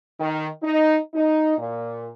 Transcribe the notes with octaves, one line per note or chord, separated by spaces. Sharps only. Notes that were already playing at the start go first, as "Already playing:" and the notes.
D#3
D#4
D#4
A#2